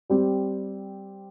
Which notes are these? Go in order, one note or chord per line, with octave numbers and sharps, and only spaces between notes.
G3 C4 G4